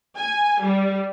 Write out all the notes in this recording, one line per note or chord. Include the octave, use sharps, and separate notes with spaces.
G#5
G3